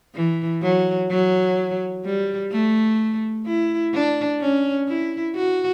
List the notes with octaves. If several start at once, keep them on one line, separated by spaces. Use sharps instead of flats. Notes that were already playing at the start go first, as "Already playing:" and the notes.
E3
F#3
F#3
G3
A3
E4
D4
C#4
E4
F#4